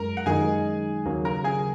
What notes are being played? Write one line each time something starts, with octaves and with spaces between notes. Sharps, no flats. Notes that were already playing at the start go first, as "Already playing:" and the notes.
Already playing: F#2 G#3 A#4 A#5
F#5
F#2 D#3 G#3 D#4 G#4 G#5
D#2 C#3 F#3 A#3
A#4 A#5
G#4 G#5